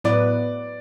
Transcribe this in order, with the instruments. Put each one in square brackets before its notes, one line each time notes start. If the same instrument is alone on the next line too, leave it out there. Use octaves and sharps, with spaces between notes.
[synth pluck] A2 F#3 B3 E4 B4 [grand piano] D5